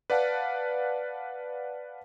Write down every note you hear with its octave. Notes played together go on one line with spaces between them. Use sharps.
B4 D5 F5 F#5 A5